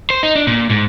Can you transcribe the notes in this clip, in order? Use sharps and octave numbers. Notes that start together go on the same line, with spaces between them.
C5
D#4
D4
A#2
G#2